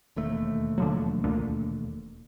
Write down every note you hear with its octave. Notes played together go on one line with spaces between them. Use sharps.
E1 D#2 A3
D3 F3 F#3
D2 A#2 D3